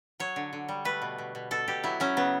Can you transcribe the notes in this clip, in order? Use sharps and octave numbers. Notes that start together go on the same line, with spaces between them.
F#3 C#5
D3
D3
G3
A3 B4
B2
B2
B2
B2 A4
B2 G4
F#3 E4
F#3 C#4
C#3 B3